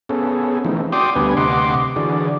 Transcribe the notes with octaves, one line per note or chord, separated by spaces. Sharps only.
B3 C#4 G#4 A4
E3 F3 A3 C4 D#4
F#4 D5 G5 C6 D6 D#6
D2 G3 B3 D4 B4 G#5
D2 C3 D#5 F#5 C6 D6
D3 E3 F#4 G#4 D5